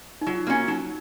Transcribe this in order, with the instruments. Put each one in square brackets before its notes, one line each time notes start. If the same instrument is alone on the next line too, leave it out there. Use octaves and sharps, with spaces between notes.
[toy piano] D#4
[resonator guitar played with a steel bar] F#3 [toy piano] F4
[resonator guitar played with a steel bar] A#3 C#4 [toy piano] F#4
[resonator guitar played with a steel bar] F#3 [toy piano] D#4